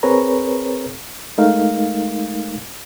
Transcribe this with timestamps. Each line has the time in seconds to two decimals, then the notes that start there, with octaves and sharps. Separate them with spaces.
0.03 C4 G#4 A#4 B4 C#5 A#5
1.38 G#3 A3 D#4 A#4 F5